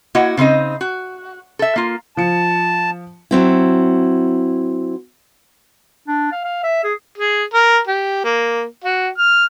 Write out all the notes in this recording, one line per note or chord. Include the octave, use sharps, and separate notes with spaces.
A#3 E4 F#4 D#5 F#5
C#3 C4 D#4 D#5
F#4
A4 E5
A#3 F4
F3 A5 C#7
F#3 C4 E4
D4
F5
F5
E5
G#4
G#4
A#4
G4
A#3
F#4
F6